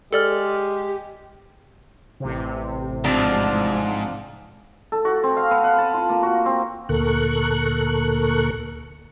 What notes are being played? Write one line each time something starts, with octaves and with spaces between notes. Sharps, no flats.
G#3 G4 A4 D5 F6
A1 C3
G#2 F3 C4 D4
A4
F#4
C4
F5
B3
F#5
A5
F4
A#3
F#4
C4
D2 A#2 A4 A#4 C#6 F#6